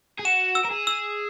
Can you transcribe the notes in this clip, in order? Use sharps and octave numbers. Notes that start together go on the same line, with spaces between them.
G#4
F#4 E7
E6
A#4
G#4
E6